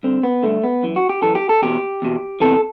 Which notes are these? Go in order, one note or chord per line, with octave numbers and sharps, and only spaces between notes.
G2 D3 C4
B3
G2 D3 A3
B3
F#2 E3
F#4
G4
F#2 E3 A4
G4
A4
E2 B2 G4
E2 B2
E2 C3 E3 A4